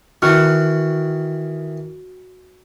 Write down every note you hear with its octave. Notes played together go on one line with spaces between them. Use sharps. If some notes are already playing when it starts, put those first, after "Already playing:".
D#3 E3 F#4 F6